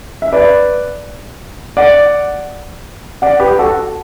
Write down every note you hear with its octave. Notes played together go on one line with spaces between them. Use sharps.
E5
B4 D5
D5 F#5
D5 F#5
G4 B4
F#4 A4